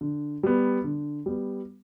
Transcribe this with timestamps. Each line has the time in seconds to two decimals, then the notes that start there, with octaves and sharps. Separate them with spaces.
0.01 D3
0.43 G3 B3
0.84 D3
1.26 G3 B3